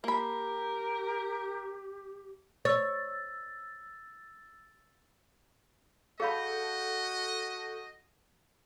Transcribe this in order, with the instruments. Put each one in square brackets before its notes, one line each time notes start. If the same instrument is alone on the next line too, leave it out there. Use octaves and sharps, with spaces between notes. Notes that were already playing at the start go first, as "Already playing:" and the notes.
[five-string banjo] A#3 B5 [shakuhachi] G4 [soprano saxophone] A#4
[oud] C#5 [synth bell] E6 A6
[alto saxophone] F#4 [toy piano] G#4 F5 B5 [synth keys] A4 G6 [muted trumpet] D#5